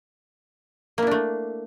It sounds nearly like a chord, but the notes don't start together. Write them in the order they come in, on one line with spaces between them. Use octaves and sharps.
A#3 E4 D4 A3